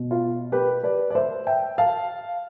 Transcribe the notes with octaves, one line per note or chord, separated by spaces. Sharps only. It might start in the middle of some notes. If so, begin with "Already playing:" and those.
Already playing: B2
F4
G4 B4
B4 D5
D5
C5 E5
E5 G5
F5 A5